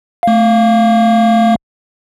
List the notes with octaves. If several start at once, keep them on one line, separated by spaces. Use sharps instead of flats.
A3 F5